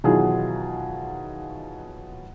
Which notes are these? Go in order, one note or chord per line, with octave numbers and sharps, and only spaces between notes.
B2 D#3 E3 F#3 F4 G#4